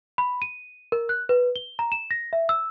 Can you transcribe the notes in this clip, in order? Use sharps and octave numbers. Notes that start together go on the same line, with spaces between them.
B5
D#7
A#4
F#6
B4
G7
A#5
E7
A#6
E5
E6